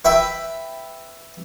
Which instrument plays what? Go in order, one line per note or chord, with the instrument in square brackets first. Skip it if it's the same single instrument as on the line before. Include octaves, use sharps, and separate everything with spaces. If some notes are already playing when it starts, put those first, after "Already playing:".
[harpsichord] B4 E5 G5 B5